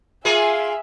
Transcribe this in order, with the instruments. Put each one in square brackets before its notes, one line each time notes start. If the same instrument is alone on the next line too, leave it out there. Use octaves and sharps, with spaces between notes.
[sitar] A#3 F4 G#4 [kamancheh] E5 G#5